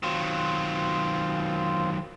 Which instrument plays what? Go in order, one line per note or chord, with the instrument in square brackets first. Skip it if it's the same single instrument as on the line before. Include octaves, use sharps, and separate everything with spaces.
[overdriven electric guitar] D#3 F#3 [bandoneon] C4 F4